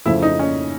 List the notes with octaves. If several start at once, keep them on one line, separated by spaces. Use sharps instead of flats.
F2 C#3 F3 A3 E4
D#4
C#4